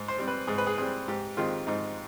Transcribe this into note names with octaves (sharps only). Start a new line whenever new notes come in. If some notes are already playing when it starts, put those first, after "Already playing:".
Already playing: G#2
C5
G3 C4
B4
G#2 G#4
B4
G#4
G3 C4 G#4
G#2 G4
D#3 G#3 C4 F4
G#2 D#4